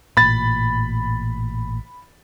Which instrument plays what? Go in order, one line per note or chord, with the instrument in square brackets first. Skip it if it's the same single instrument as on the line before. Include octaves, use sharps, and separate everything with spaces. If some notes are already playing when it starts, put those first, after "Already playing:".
[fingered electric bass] A1 A#2 [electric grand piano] B5 A6